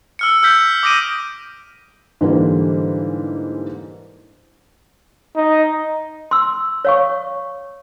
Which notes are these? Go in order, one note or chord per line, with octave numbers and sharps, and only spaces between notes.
E6 F6 C#7
E6 F6 G6 B6
D6 D#6 A#6 D7 D#7
G#2 D3 E3 G3 A#3
D#4
C6 E6
C#5 F5 C#6